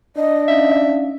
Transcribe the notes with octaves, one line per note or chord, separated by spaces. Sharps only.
D4 D#5
C#4 D#4 E5 F5